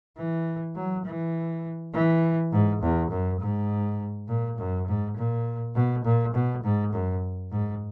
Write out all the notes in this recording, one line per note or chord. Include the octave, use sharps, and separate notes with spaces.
E3
F#3
E3
E3
G#2
E2
F#2
G#2
A#2
F#2
G#2
A#2
B2
A#2
B2
G#2
F#2
G#2